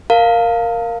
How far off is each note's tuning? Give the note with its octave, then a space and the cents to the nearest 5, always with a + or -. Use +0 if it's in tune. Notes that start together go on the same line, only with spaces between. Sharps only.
A#4 +0 F5 +0 A5 +45